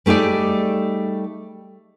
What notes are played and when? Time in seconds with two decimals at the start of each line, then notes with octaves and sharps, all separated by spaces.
0.06 G3 A3 D#4 G#4 D5